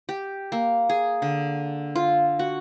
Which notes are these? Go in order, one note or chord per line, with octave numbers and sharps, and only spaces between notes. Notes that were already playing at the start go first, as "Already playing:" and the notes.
G4
A#3
G#4
D3
F4
F#4